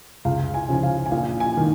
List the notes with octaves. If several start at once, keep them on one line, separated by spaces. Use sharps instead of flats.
C#2 F5
G#5
C#3 F3 G#5
F5
G#5
A#1 F5
G#5
D#3